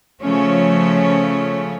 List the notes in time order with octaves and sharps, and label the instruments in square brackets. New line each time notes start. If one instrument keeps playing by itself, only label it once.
[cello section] C#3 F3 A3 C#4